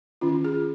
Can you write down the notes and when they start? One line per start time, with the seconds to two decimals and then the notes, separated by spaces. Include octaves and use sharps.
0.21 D#3 C#4 F4
0.45 G#4